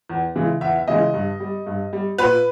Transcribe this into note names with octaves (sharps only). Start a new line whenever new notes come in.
E2
C#3 E3 G#3
E2 E5
E5
C#3 E3 G#3 D#5
G2
G3
G2
G3
A#2 B4